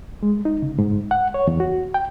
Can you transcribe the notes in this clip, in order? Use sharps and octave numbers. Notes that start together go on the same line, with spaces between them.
G#3
D#4
C#3
G#2
F#5
C#5
E2
F#4
G5